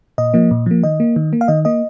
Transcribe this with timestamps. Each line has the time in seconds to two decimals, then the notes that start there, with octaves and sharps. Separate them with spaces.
0.18 A#2 D#5
0.34 F3 A#3
0.51 A#2
0.66 F3 A#3
0.83 D#3 D#5
1.00 A#3
1.16 D#3
1.33 A#3
1.41 F5
1.48 D#3 D#5
1.65 A#3 D#5